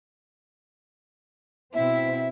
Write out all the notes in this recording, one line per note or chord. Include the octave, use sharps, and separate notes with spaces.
B2 C4 E4 E5